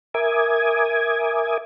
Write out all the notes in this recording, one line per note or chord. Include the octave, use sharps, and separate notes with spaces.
A#4 E5 G#5 D6 D#6 G#6